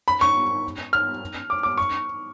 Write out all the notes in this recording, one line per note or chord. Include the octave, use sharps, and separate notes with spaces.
B5
C#6
F6
D6
D6
C#6